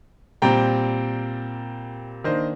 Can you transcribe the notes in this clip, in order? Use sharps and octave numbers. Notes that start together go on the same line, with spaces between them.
A#2 G3 C4 G5 A#5
D#3 A#3 D4 C5 D#5